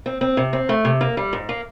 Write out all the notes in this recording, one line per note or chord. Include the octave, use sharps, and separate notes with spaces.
C4
C4
C3
C4
A3
C3
A#3
G3
G#2
A#3